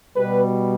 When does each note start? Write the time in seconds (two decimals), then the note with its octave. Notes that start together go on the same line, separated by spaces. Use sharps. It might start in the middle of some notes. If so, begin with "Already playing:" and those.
0.16 B2 G3 B4